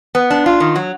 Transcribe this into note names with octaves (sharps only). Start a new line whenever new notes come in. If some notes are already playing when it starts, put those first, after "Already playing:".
B3
D4
F4
D#3
F#3